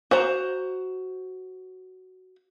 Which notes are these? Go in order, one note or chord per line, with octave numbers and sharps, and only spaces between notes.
F#4 C5 A#5